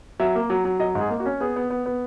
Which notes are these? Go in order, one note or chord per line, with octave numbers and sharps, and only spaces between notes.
F#3 E5
A#3
F#3
F#3
F#3 D#5
G#2
G#4
A#3
F#4
C#4
B3 G#4
B3
B3
B3